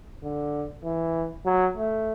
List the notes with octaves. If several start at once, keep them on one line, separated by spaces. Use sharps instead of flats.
D3
E3
F#3
A3